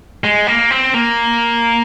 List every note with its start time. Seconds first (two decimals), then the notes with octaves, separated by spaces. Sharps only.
0.24 G#3
0.47 A#3
0.71 C4
0.94 A#3